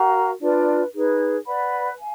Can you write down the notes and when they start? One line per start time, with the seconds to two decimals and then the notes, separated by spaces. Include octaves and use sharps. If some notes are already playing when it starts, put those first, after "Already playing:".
Already playing: F#4 A#4 F5 A#5
0.41 D4 F4 B4 D5
0.93 D#4 G#4 B4
1.46 B4 D5 F#5 B5
1.99 F5 G#5